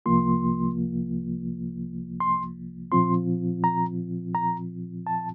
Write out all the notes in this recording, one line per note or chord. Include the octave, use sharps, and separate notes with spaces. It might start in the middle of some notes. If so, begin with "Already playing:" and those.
C2 C3 F3 A#3 F4 C6
C6
A#2 F3 C4 F4 C6
A#5
A#5
A5